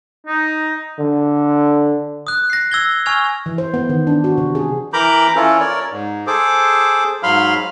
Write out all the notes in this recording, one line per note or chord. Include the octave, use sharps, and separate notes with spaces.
D#4
D3
D#6 F#6
A#6 C7
E6 G#6 G7
G#5 C#6 E6 F6 G#6 F7
E3
C5
B3
D#3
D4
F#4
C3
G#4
E3 A#4 A#5 B5 D6 G6
E3 C#4 E4 F4 A4
A#4 C#5 D5
G#2
G#4 A4 C5 D6
G#2 F#3 F5 B5 C6 F6